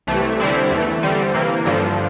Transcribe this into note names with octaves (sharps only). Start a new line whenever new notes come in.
C2 C3 E3 A3
D3 G3 C4 E4
E2 E3 A3
D3 G3 C4
C3 E3 A#3
G2 D3 F3